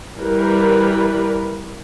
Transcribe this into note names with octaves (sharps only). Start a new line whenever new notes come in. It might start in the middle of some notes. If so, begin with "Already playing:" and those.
E3 G3 A#4 B4